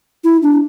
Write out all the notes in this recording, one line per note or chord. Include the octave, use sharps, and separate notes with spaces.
E4
D4